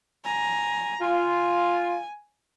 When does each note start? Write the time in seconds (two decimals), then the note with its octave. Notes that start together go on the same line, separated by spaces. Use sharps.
0.25 G#5 A#5
1.01 F4 G#5